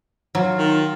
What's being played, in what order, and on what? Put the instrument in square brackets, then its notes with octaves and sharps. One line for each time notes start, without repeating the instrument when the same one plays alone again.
[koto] F#3 [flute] F4
[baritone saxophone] D#3